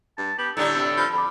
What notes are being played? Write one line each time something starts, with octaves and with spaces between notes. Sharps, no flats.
G2 A5
B3 G4 F#7
A2 D3 G3 D#4 A4
C3
F3 B5
F2 B5 D6